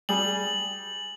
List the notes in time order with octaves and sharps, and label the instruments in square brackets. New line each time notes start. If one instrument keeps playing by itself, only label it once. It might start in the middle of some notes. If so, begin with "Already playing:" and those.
[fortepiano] G3 G#4 [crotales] F#7